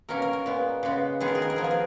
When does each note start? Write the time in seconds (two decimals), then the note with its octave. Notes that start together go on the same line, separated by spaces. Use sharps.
0.09 B2 A#3 C#4 A#4
0.22 A#4
0.33 A#4
0.46 A#2 G#3 B3
0.83 C#3 G#3 B3
1.20 D#3 G#3 B3 G#4
1.28 A#4
1.35 G#4
1.42 A#4
1.50 G#4
1.56 F3 B3 A#4
1.64 G#4
1.71 A#4